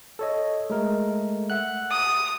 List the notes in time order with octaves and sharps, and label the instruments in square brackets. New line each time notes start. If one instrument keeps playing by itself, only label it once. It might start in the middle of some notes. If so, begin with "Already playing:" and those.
[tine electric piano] A4 C#5 D#5
G#3 A3 A#4
E5 F#5 F#6
[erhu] D#6